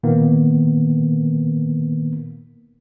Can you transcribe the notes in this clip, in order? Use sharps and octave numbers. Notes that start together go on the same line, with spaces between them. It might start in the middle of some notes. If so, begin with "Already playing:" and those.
A#2 D#3 A#3 B3